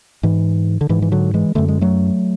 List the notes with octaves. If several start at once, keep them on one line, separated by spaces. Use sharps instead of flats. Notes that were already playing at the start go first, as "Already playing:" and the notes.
G#2 E3
D3
G#2 E3
E3
D3 F#3
E3 G#3
F#2 D3 A3
G#3
F#3 A3